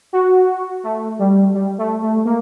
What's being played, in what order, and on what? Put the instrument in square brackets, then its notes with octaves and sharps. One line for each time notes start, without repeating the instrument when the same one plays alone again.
[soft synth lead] F#4
A3
G3
G3
A3
A3
A#3